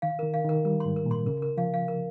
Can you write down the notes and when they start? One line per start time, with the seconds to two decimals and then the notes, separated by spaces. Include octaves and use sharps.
0.02 D#3 F5
0.19 D#3 A#4
0.34 F5
0.44 D#3
0.49 A#4
0.65 G3 A#4
0.80 G#2 C6
0.96 A#4
1.06 A#2
1.11 C6
1.26 C#3 A#4
1.42 A#4
1.57 F3 F5
1.74 F5
1.88 A#4